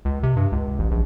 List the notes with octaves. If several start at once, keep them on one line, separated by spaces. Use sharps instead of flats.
C#2
C3
G2
C#2
A1
A#1